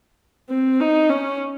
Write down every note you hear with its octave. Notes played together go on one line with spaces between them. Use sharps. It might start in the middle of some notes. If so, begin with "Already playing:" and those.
C4
D#4
C#4